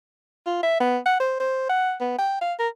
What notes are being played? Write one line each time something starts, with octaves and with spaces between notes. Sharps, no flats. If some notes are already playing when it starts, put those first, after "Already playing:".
F4
E5
B3
F#5
C5
C5
F#5
B3
G5
F5
A#4